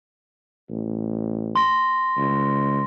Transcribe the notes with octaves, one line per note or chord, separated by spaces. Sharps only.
A1
C6 A#6
C#2